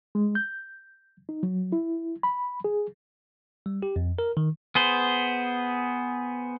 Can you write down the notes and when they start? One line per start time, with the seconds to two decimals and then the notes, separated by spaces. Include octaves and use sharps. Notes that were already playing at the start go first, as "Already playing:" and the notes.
0.15 G#3
0.35 G6
1.29 D#4
1.43 F#3
1.72 E4
2.23 B5
2.64 G#4
3.66 G3
3.83 G4
3.96 F2
4.19 A#4
4.37 D#3
4.75 B3 G#4 C5